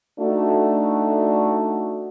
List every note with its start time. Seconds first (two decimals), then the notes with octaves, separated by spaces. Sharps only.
0.19 A3 D4 D#4 F#4